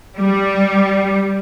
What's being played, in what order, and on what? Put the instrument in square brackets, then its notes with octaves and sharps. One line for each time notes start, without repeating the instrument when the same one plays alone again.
[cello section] G3